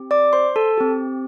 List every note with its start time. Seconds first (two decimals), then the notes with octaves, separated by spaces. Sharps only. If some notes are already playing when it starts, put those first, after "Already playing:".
Already playing: C4 G4
0.11 D5 D6
0.33 C5 C6
0.56 A4 A5
0.77 C4 G4